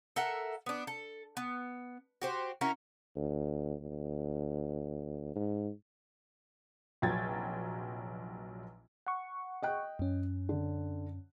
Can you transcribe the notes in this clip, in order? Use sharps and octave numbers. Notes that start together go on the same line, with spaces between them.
A4 A#4 E5 F#5
B3 D4
A4
B3
F#4 G4 C5
C#4 E4 F#4 A#4
D2
D2
G#2
F1 A#1 F#3 G5 G#6 A6
F#5 C#6
D#5 G5 F#6
F#2 C#4
D3